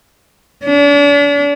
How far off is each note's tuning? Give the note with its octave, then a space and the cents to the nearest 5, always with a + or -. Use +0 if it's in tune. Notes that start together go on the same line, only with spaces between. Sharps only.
D4 -40